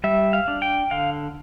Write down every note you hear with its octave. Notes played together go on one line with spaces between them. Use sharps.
G3 E5
F5
D4
G5
D3 F5